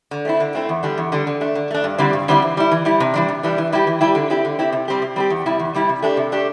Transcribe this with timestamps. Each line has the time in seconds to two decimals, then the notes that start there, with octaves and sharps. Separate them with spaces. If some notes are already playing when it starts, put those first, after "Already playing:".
0.11 D3
0.25 A3 C4 E4
0.40 D3
0.55 A3 C4 E4
0.69 E2
0.83 D3 G3 D4
0.98 E2
1.12 D3 G3 D4
1.27 D3
1.41 A3 D4
1.55 D3
1.71 A3 D4
1.84 G2
1.98 D3 G3 C4 E4
2.13 G2
2.28 D3 G3 C4 E4
2.42 E3
2.57 G3 E4
2.72 E3
2.85 G3 E4
3.00 C3
3.14 E3 G3 D4
3.28 C3
3.43 E3 G3 D4
3.58 E3
3.72 G3 E4 G4
3.87 E3
4.01 G3 E4 G4
4.15 D3
4.30 C4 E4 G4
4.45 D3
4.59 C4 E4 G4
4.73 C3
4.88 G3 C4 G4
5.02 C3
5.16 G3 C4 G4
5.30 E2
5.46 C3 G3 E4
5.59 E2
5.74 C3 G3 E4
5.89 C3
6.02 A3 D4 G4
6.17 C3
6.32 A3 D4 G4